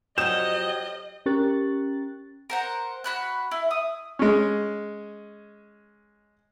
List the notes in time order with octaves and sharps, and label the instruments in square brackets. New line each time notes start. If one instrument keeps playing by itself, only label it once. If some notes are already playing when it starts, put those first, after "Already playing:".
[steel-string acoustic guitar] F2 F#3 [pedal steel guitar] G4 C5 D#6 [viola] D#5 [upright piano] E7
[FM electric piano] C#4 G4 A#4 C#6 F#6 A6
[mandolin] A#4 C5 F#5
F#4 B5 F#6
E4
D#6
[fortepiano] G#3 C#4